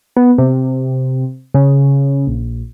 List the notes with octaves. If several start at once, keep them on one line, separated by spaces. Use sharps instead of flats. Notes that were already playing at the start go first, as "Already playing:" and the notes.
B3
C3
C#3
A#1